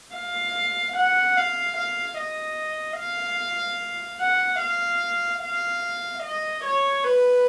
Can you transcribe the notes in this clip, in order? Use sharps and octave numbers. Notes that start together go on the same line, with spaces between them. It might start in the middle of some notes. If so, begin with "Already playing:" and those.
F5
F#5
F5
F5
D#5
F5
F#5
F5
F5
D#5
C#5
B4